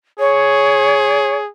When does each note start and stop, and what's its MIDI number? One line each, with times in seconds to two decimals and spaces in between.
0.19 1.49 68
0.19 1.35 73